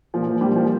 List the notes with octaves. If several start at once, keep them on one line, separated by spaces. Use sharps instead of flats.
A#2 F3
F3
A#2 G3
F3